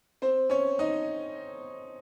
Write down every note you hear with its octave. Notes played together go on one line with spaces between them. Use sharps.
C4 C5
C#4 C#5
D#4 D#5